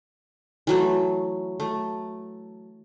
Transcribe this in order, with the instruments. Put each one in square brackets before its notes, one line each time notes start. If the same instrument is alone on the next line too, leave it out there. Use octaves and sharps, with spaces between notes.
[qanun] E3 F#3 A3
A3